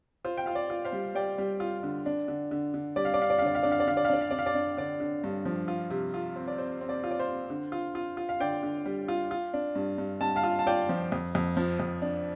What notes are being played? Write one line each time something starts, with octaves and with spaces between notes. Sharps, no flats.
F4 C5
G5
F4 F5
D5
F4
C5 F5
G3
G3 D5 G5
G3
F4
D3
D4
D3
D3
D3
G3 D5
F5
D5
D4 F5
D5
F5
D3 D5
F5
D3 D5
F5
D5
D3 F5
D5
F5
D4 D5
F5
D4 D5
F5
D5
D4
D3 D5
D3
G2
F3
F4
C3
F4
C4
D5
C4 C5
C4
D5
F4
D5
C5 F5
C4
D3
F4
F4
F4
F5
D3 D5 G5
D3
G3
F4
F4
D4
G2
G2
G2 A5
F5 A5
F4
A5
F4 D5 G5
F3
F2
F2
F3
F2
D4